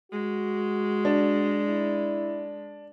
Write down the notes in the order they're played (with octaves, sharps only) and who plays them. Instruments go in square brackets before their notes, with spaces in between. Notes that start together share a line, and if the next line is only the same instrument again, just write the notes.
[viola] G#3 [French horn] F#4
[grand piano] D4
[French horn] E4